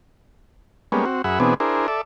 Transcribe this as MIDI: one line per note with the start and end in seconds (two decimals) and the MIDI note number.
0.92 1.05 55
0.92 1.05 56
0.92 1.05 58
0.92 1.05 59
0.92 1.05 61
1.05 1.22 60
1.05 1.22 66
1.24 1.39 42
1.24 1.39 68
1.24 1.39 76
1.24 1.39 78
1.24 1.39 83
1.40 1.54 47
1.40 1.54 52
1.40 1.54 59
1.40 1.54 60
1.40 1.54 62
1.40 1.54 68
1.60 1.87 62
1.60 1.87 64
1.60 1.87 68
1.60 1.87 70
1.60 1.87 72
1.88 2.01 69
1.88 2.01 74
1.88 2.01 76